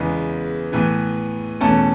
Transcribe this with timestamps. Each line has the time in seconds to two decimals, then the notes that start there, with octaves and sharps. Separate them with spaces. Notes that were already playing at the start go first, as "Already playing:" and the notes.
Already playing: E2 C#3 G#3 B3
0.72 A2 E3 B3
1.61 E2 B2 A3 C#4 A5